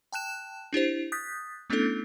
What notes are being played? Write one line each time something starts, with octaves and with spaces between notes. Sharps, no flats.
G5 A5 F#6 E7
D4 E4 G4 C5
D#6 F#6 G6 A6 B6
A3 B3 C#4 D4 E4 A4